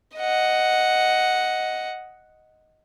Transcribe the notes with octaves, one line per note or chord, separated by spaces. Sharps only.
D#5 F#5